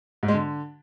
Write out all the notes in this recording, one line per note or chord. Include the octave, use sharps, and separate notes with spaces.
G#2
G#3
D3